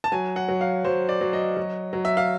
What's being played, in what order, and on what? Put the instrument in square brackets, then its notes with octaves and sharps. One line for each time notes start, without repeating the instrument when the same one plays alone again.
[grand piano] A5
F#3 G#5
F#5
F#3
F5
F#3 C5
D5
F#3
D#5
F#3
F#3
E5
F5